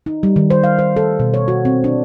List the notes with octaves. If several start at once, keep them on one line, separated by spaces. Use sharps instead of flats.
D#4
G3
D#3
C5
F5
C5
A4
B2
C#5
F#4
C4
D4